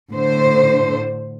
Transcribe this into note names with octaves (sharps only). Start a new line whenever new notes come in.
A2 D3 C5